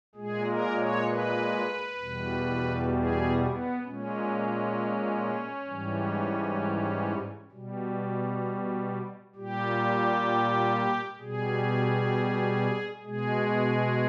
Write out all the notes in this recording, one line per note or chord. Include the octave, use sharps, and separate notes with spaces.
A#2 G#3 G#4
A#4
C#5
B4
E2 B2 G3
G#4
B3
A#2 G#3 C#4
G#2 E3 G3
B2 G3
A#2 G3 G4
B2 G3 G#4
B2 G#3 G#4